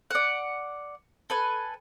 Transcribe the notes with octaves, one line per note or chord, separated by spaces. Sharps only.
D5 F#5
A4 B4 G#5